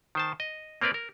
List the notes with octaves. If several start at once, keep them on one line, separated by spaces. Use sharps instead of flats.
D#3 C5 A5
D#5
A#3 C4 A#4 B4 D5
A#4